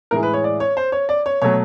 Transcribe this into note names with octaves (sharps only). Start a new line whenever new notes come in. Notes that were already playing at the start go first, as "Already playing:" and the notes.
A2 E3 G#3 A#4
B4
C#5
D5
C#5
C5
C#5
D5
C#5
B2 F#3 A3 C#5